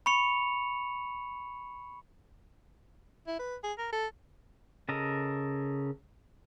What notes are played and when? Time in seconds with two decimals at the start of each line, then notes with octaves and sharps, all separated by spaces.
0.06 B5 C#6 C#7 F7
3.27 E4
3.39 B4
3.64 G#4
3.78 A#4
3.93 A4
4.89 C#3 A4 A#4 D#5